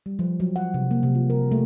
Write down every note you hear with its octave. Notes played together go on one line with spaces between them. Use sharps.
G3
F3
F#3
F#5
C3
A#3
C3
F4
A#4
A3